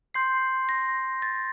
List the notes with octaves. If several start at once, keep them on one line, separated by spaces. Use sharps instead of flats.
C6 G6 C7
A#6
A6